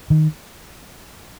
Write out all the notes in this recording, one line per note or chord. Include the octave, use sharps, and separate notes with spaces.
D#3